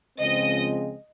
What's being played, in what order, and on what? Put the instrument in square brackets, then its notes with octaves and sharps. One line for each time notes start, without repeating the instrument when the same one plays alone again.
[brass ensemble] C#2 C#3 F3 G#3 C4 [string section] D#5